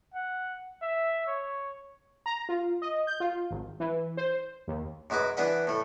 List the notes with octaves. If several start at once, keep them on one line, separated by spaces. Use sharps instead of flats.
F#5
E5
C#5
A#5
F4
D#5
G6
F4
G#1
E3
C5
D#2
F#2 G#3 F#4 B4 D6
E3 B3 D4 B4 F#5
A2 A3